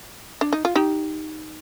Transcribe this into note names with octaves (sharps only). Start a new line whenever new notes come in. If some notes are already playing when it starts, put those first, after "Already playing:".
D4
D#4
F4
D#4 G4